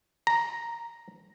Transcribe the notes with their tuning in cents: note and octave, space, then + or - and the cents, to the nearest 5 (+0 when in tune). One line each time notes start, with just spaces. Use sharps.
A#5 +0